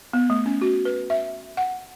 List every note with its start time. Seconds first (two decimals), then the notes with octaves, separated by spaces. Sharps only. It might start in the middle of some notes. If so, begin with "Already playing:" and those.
0.13 B3
0.30 A3
0.46 C#4
0.62 F#4
0.85 B4
1.10 E5
1.57 F#5